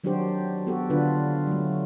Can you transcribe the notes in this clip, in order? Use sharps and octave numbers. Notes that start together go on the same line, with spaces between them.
D#3 F#3 D4 F#4 G4 C5
B3 F#4 G4 A4
D3 D4 F4 B4
F#3 A3